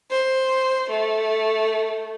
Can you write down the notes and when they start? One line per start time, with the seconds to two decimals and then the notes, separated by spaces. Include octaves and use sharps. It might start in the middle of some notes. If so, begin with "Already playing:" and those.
0.10 C5
0.90 A3